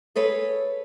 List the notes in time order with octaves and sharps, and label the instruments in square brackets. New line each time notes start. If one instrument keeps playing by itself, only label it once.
[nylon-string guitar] G#4 A4 B4 C#5